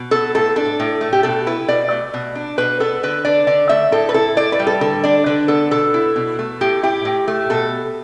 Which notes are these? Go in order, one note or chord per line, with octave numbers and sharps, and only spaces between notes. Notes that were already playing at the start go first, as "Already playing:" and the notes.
Already playing: B2
B3 A4
A2 A4
D4 A4
A2
A3
G4
B2 A4
E4 B4
B2 D5
A3
B2
D4
B2 B4
B3 A4
D3 B4
D4 D5
D3 D5
A3 E5
A2 A4
B4
E4 A4
A2 D5
B4
G3
A4
D3 A4
D4 D5
D3 B4
B3 A4
B2 A4
E4
B2
A3
A2 G4
E4 G4
A2
A3
B2 A4